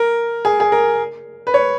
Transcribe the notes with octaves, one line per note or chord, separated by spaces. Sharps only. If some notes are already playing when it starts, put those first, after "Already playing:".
Already playing: A#4
G#4
G#4
A#4
B4
C#5